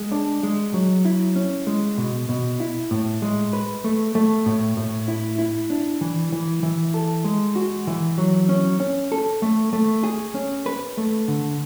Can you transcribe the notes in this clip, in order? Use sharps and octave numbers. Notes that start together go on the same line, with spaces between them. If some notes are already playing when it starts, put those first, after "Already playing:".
Already playing: G#3
D4
G#3
F#3
E4
C#4
G#3
B2
B2
E4
A2
G#3
B4
A3
A3
A2
A2
E4
E4
D4
E3
E3
E3
A4
G#3
F#4
E3
F#3
C#4
C#4
A4
A3
A3
G#4
C#4
B4
A3
D3